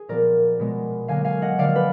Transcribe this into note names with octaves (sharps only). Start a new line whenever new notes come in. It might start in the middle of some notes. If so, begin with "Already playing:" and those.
Already playing: G#4
A#2 F3 B3 A#4 D5
B2 G#3 B3
D3 F#3 A#3 F5 G#5
F5 G#5
D#5 F#5
D3 F3 A#3 D5 F5
D5
B4